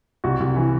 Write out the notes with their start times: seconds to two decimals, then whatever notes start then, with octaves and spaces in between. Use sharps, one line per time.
0.24 C2 F#4
0.40 C2
0.56 E3